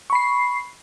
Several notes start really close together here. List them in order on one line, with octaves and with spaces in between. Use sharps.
C#6 B5 C7